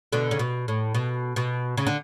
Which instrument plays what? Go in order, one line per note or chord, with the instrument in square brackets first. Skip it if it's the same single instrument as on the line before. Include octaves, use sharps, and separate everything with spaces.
[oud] B2 D3
C#3
B2
A2
B2
B2
C#3
D3